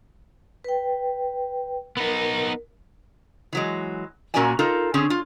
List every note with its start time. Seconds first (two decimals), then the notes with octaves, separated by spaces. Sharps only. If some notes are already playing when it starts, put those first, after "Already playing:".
0.64 B4 G5
1.97 B3 D#4 A#4
3.53 E3 F#3 G#3
4.34 A#2 A#3 C#4 F#4 D5 G#5
4.59 D#4 F4 A4 A#4
4.94 D3 C4 C#4 G#4
5.10 F4